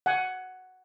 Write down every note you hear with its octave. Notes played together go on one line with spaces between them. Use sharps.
F#5 G#5